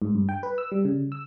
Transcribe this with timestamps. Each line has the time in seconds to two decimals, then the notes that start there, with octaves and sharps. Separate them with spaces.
0.02 G#2
0.15 G2
0.29 G5
0.43 B4
0.58 E6
0.71 G3
0.85 C#3
1.12 E6